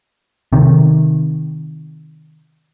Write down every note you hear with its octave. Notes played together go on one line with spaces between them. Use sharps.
C3 D#3